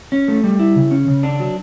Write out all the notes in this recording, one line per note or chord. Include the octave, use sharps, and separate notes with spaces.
C#4
A3
G3
E4
C#3
C#4
C#3
D4
F#3